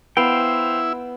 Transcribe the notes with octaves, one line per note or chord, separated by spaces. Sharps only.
B3 E4 C5 F5 G5